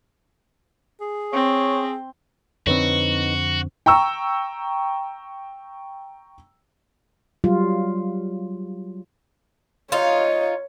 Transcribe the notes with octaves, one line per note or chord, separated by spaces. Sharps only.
G#4
C4 C#5
F2 D3 C4 D#4 F#4 B4 C#5
G5 A#5 C#6 E6
F#3 G3 F4
D#4 F4 C#5